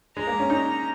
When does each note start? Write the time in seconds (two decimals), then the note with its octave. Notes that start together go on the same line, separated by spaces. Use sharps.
0.17 G#3 A#5
0.27 A#3
0.39 C#4
0.50 D#4